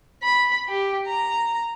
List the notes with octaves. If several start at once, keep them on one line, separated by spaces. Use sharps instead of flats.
B5
G4
A#5